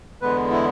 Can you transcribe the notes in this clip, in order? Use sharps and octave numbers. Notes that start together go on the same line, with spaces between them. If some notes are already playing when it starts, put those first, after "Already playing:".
E2 D3 G#3 B3 B4
E4